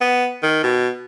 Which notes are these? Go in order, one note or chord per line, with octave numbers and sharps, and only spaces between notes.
B3
D#3
B2